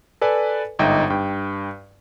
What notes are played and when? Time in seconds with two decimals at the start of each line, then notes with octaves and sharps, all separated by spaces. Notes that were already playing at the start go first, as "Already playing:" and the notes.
0.21 A4 B4 D5 G#5
0.79 G1 G#2 D#4 E5 G5
1.10 G2 G5